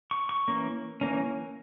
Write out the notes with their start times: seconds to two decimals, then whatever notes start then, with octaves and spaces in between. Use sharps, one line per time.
0.11 C#6
0.29 C#6
0.48 E3 A#3 C#4
1.01 E3 A#3 C#4